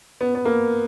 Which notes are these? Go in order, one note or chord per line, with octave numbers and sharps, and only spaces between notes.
B3
B3
A#3